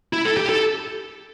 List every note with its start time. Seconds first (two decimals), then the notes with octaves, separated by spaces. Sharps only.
0.13 E4
0.25 A4
0.37 G4
0.50 A4